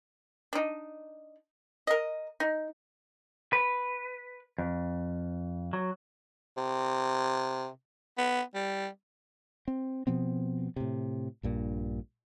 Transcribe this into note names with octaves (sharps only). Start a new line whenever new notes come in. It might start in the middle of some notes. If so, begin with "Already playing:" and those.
D4 D#4
A#4 D#5
D#4
B4
F2
F#3
C3
B3
G3
C4
B2 F3 B3 C4
A2 C3
A#1 G2 A#2